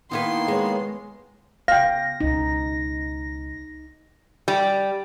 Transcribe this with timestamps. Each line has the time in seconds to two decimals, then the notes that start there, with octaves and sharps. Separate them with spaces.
0.11 D#3 A#3 B3 D#4 E4 B4 C6
0.48 G#3 G#4 B4 C#5
1.68 C#3 B3 F5 G5 A#6
2.20 C#2 B2 D#4
4.48 G3